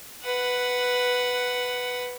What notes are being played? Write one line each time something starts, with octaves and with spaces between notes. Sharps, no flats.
B4 F#5